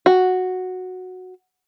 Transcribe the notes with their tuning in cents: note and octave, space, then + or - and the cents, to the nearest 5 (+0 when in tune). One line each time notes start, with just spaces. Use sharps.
F#4 -5